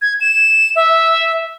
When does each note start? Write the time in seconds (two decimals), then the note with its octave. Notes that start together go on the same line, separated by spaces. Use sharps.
0.02 G#6
0.21 E7
0.76 E5